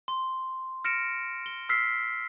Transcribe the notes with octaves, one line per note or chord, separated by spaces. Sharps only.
C6
F6 A#6 C#7 D7 E7
G7
E6 F6 B6 C7